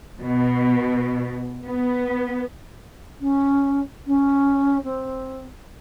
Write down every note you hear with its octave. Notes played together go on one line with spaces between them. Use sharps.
B2
B3
C#4
C#4
C4